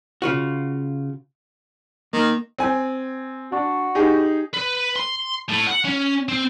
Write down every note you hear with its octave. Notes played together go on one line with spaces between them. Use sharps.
C#3 F4 F#4
D#3 A#3
C4 G#5
D4 F#4
D#4 G4 G#4
B4
C6
A2
F#5
C#4
C4